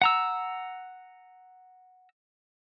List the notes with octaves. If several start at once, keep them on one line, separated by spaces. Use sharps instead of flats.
F#5 A#5 E6